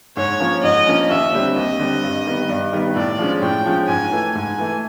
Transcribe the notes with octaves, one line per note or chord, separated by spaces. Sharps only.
G#2 C#5
F3 A#3 C#4
G#2 D#5
F3 A#3 C#4
D#2 E5
D3 G3 C4
D#2 D#5
D3 G3 C4
G2
D#3 G3 B3
G2
D#3 G3 B3
A2 D5
F3 G#3 C#4
A2 G5
F3 G#3 C#4
G#2 G#5
E3 A3
G#2 G#5
E3 A3